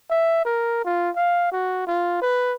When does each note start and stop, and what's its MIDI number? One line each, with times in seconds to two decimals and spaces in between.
0.10 0.44 76
0.45 0.82 70
0.85 1.10 65
1.16 1.51 77
1.52 1.85 66
1.87 2.21 65
2.22 2.54 71